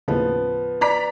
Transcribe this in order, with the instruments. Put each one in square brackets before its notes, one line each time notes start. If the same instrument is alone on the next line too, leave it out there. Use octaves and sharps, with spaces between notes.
[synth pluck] D#2 A2 C#3 [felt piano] F3 B3
[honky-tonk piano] D5 A#5 B6